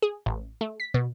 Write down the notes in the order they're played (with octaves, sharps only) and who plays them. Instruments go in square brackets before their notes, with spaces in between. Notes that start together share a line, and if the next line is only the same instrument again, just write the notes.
[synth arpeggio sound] G#4
A1
A3
B6
B2